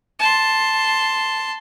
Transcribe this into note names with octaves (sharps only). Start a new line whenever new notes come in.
A5 C6